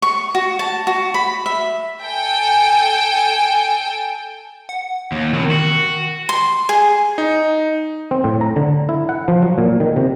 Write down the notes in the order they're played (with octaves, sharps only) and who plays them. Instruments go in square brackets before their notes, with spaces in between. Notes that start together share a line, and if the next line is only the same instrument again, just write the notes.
[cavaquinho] C#6
F#4
A5
F#4
B5
E5
[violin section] A4 G5 G#5
[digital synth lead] F#5
[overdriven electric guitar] D#2
[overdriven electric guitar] E2 C3 [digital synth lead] D#3
[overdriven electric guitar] F#4
[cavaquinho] C6
G#4
[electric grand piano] D#4
[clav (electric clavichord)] C4
A2
A#5
D3
E4
F#5
F3
F#3
A#2
D#3
C3